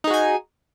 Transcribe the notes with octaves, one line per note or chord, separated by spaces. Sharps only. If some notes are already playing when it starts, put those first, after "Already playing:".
D#4 F#4 G#4 G#5